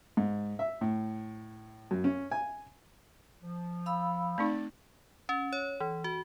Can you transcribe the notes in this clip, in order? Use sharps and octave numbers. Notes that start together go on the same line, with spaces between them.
G#2
E5
A2
F#2
C#4
G#5
F3
F5 B5 E6
A3 C4 D#4 D5
C#4
C#5
E3
F#4